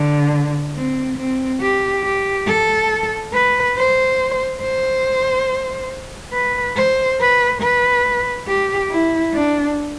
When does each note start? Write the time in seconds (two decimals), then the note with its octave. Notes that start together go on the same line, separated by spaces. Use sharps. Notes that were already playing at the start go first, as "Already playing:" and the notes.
Already playing: D3
0.76 C4
1.17 C4
1.61 G4
2.03 G4
2.47 A4
3.33 B4
3.76 C5
4.61 C5
6.33 B4
6.76 C5
7.20 B4
7.61 B4
8.48 G4
8.90 E4
9.33 D4